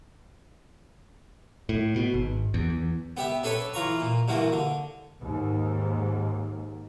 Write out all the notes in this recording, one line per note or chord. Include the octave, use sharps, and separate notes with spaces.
A2
B2
G#1
E2
E2
B3 G4 E5
D4 A4 B4 C#5
E3 F4 A#5 C#6
A#2
G2 A#2 E3 F#4
D3
D#2 G#2